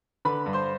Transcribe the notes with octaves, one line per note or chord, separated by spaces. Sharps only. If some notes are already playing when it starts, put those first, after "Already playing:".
D3 B4 B5
G2
C5 C6